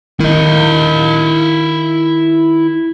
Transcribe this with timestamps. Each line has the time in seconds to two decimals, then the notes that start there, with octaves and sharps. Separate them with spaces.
0.20 D#3 E4 D#5